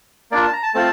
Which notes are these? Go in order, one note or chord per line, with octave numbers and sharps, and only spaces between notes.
A#3 D4 F4 D5
A5
A#5
A5
A3 C4 F4 A5